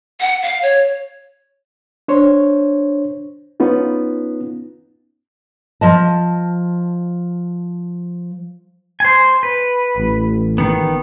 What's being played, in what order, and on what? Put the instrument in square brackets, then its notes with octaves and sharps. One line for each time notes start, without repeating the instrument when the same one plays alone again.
[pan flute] F#5
F5
C#5
[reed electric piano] D4 C5 C#5
B3 C#4 D#4 F4
[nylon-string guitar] F3 D#5 A5
[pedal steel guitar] C5 G#5
B4
[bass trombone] A1
[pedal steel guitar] D#3 B3